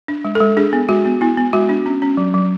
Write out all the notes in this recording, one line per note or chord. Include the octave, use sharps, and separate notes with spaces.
D4
G#3
A4
G#3
D4 G#4
B3
G#3 F#4
B3
B3 E4
B3
G#3 F#4
D4
C#4
C#4
F#3
F#3